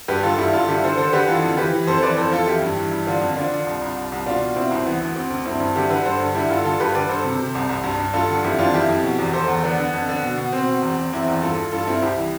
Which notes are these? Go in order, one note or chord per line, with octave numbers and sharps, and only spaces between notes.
G2 G4 B4
D3 F4 A4
G2 E4 G4
G2 F4 A4
D3 E4 G4
D3 A4 C5
D3 A4 C5
D3 G4 B4
E3 F4 A4
F2
E3 G4 B4
E3
F2 A4 C5
C5
E3 B4 D5
F2 A4 C5
F2 F4 A4
E3 E4 G4
G2
E3
G2
D3 D4 F4
F2
D3 D4 F4
D3
C2
C2
C2
C2
B2 D4 F4
B2
B2 C4 E4
C2 C4 E4
E3 B3
D2
D2 C4
D2
G2 C4 E4
G2
D3 E4 G4
D3 G4 B4
G2 A4 C5
G2
D3 E4 G4
G2 F4 A4
D3 F4 A4
G2 G4 B4
D3 B4 D5
G2 A4 C5
C3
C3
C2
C2
G2
G2
G2 F4 A4
D3
F2 E4 G4
F2 D4 F4
F2 E4 G4
F2
B2
E2
E2 A4 C5
E2
D3 B3 D4
D3 B3
F2
D3
B2
B2
B2 C4
B2
E2
E2
E2 C4 E4
E2
G2 F4 A4
E3
G2 F4 A4
G2 C4 E4
C2 E4 G4
E3